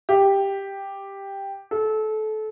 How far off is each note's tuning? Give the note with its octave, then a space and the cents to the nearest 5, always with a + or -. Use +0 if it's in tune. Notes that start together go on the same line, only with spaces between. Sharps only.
G4 +5
A4 -25